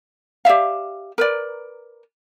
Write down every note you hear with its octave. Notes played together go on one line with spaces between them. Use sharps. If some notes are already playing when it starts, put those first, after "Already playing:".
G4 D5 E5 F5
A#4 B4 D5